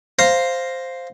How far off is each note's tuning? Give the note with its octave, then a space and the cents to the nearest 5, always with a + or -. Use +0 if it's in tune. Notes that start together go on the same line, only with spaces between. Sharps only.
C5 +0 F5 +0 A#5 +0